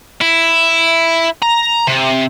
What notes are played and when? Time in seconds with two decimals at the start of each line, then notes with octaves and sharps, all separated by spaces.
0.21 E4
1.42 A#5
1.87 C3